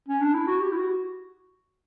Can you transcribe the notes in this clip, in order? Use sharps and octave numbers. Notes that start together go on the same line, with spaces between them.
C#4
D4
E4
F#4
G4
E4
F#4